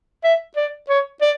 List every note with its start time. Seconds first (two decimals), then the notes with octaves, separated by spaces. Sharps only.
0.24 E5
0.56 D5
0.89 C#5
1.21 D5